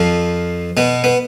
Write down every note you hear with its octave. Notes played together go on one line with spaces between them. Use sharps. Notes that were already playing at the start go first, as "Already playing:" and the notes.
Already playing: F2 F3
B2 B3
B3